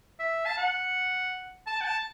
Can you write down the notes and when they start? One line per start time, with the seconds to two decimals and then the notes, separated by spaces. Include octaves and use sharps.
0.20 E5
0.46 A5
0.57 F#5
1.67 A5
1.81 F#5
1.85 A5